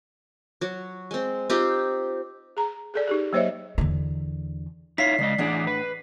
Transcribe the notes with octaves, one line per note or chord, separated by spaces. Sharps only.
F#3
G#3 C4
C4 D#4 F4 G4
G#4 A#5
G#4 A4 D5
D#4 G4 G#4
F#3 A#3 C5 C#5 D#5 E5
E2 D3
D#4 E4 C#5 F5 B6 C7
C#3 G#3 D5 D#5
A2 E3 D4 G#4 D5 F#5
B4